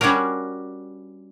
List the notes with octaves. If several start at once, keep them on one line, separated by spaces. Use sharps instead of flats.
G3 C#4 D4 F#4 A#4